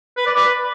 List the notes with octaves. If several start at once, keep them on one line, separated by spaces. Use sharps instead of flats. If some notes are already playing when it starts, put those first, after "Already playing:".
B4
D5
B4